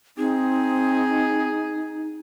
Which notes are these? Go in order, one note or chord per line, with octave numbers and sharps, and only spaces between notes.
C4 D#4 G#4